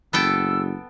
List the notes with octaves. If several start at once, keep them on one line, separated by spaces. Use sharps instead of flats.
F#1 B3 A4 G5 E6